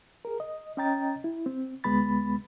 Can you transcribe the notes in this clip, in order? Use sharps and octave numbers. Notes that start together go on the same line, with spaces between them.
G#4 A#4
D#5
C#4 D#5 G5 A#5 A6
E4
C4
D2 G#3 B3 B5 A6